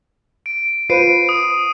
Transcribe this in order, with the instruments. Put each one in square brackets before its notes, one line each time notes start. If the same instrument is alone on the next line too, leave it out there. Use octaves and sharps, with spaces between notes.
[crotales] D7
[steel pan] F4 B4 C5 [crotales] C7 D7 D#7
[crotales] D#6